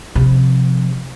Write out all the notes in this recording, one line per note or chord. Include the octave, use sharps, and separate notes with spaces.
C3 F3